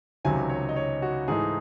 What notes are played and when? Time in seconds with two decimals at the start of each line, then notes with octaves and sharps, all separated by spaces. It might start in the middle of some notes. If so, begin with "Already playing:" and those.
0.25 C#2 C3 D#3 F#3 C#4 G#5
0.49 C#5
0.69 D#5
0.76 C#5
1.02 F#4
1.28 G#2 E3 A3 D#4 G#4